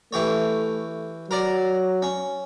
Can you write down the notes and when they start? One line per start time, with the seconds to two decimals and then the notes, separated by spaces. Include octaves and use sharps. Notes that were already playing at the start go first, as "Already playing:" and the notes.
0.13 E3 A3 G4 C#5
1.31 F#3 A#4 D5
2.02 C#4